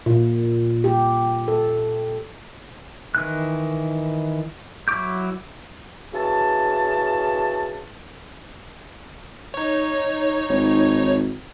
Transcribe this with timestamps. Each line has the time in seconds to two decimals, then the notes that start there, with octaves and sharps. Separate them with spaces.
0.06 A#2
0.84 G4
1.48 A4
3.15 D#3 E3 F#6
4.88 F#3 E4 C#6 D6 G6
6.13 C#3 E3 F#4 A5
9.54 D#4 C#5
10.49 G#1